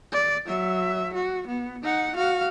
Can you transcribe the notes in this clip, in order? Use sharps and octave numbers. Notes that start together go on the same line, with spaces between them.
D5
F#3 E5
F#4
B3
D#4 F#5
F#4 F5